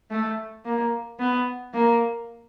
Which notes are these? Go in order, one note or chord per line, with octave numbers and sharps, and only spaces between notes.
A3
A#3
B3
A#3